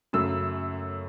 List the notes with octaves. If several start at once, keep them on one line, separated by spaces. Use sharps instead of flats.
F#2 C#3 F#3 A3 E6